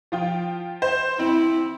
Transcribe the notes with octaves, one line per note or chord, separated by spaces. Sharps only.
F3 F4 G5
C5
C4 E4